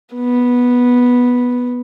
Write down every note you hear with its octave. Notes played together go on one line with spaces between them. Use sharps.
B3